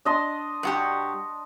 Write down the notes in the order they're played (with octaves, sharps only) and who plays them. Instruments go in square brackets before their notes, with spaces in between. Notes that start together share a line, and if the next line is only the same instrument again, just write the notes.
[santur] D4 D#5 C6
[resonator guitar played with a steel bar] G2 F#4 G4